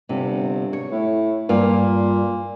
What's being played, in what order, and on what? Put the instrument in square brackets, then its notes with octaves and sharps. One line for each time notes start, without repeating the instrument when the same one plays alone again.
[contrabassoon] G1 [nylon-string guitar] C3
[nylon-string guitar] C#5
[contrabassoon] A2
[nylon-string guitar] G2 A#3 F4 [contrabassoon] A#2